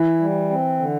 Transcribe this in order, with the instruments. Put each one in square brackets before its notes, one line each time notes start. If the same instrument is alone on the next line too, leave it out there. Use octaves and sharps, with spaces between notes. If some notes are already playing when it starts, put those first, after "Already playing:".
Already playing: [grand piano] E3 [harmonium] E4
[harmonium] G3
C4
D3